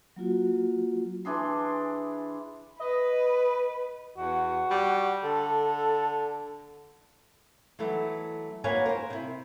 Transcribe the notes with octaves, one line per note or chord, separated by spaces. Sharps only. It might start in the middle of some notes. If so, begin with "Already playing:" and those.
F#3 A#3 F4 F#4
E3 D4 G#4 C6
B4 D#5
E2 F#4
G3
D3 A4
E3 F#3 A3 B3
A#3 F#4 B4 C#5 F5 G#5
A#4 C5
C3 E4